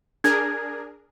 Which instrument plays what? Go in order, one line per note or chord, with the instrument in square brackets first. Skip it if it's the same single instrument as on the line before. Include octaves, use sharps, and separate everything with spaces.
[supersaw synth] D4 G#4 A#4 [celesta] G#6